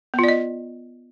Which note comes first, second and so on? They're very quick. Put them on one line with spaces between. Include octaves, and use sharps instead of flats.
B3 F4 D5 D#5